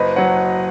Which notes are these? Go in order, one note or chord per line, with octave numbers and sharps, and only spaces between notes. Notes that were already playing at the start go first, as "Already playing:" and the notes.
Already playing: F#1 B4 D#5
F#3 C#5 F#5